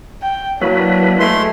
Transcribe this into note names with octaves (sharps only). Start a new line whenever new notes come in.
G5
F#3 A#3 D4 E4 B4
G#3 A3 C6